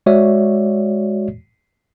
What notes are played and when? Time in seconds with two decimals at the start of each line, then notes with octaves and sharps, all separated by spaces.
0.06 G#3 F#4 C#5 D5 E5